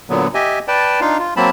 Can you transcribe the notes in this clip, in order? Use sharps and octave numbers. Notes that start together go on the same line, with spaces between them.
A#2 D3 F#3 B3
G4 D#5 E5 G#5
B4 D5 G5 A5
D4 D#4 F4 F5
F4
F#3 A#3 C4 A5 B5